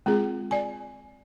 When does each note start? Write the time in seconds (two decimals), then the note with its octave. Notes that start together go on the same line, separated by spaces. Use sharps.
0.06 G#3 C4 F4 G#4
0.51 D5 G#5